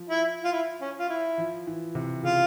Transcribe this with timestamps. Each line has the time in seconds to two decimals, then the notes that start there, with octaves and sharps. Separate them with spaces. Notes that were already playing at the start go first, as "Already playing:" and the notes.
Already playing: F3
0.09 E4
0.45 F4
0.52 E4
0.81 C#4
0.99 F4
1.09 E4
1.38 F3
1.67 E3
1.95 C3
2.24 C#3 F4